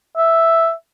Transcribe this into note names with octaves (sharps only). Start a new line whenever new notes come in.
E5